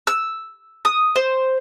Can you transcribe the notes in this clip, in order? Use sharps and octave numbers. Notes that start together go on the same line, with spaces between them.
E6
D#6
C5